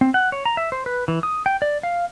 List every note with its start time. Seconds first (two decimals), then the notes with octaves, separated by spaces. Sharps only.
0.01 C4
0.14 F#5
0.32 C#5
0.46 A#5
0.57 E5
0.72 C5
0.86 B4
1.08 E3
1.23 D#6
1.46 G5
1.62 D5
1.83 F5